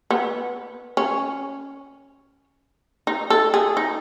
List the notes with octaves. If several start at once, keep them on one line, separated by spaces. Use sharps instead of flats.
B3
C#4
D#4
A4
G#4
D#4